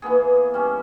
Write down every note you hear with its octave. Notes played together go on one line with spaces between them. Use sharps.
E3 A#3 B3 G#4
G3 C#4